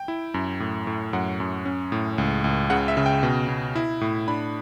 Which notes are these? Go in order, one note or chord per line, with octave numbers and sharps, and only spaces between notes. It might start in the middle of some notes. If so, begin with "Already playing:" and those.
Already playing: G5
E4
F#2
A2
A2
F#2 F#5
F#2
C#4
A2
C#2
C#2
C#3 F#5
E5
C#3
G5
B2
B2
E4
A2
D4 B5